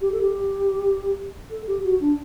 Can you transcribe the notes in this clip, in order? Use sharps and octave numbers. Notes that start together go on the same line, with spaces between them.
G4
A4
G4
A4
G4
F#4
D4